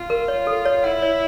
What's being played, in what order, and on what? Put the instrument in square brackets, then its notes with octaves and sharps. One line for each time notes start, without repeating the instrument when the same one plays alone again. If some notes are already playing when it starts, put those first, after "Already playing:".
Already playing: [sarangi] F4
[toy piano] A#4
C#5
A4
C#5
[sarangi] E4 [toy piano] F#5
[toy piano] C#5